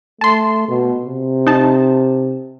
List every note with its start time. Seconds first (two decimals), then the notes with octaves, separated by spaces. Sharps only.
0.21 A3 A5 C6
0.68 B2
1.05 C3
1.47 D#4 A5